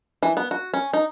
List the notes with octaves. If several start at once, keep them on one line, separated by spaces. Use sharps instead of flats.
E3
B3
F#4
C#4
D#4